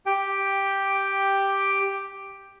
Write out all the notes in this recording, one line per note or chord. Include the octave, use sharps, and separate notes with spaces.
G4 G5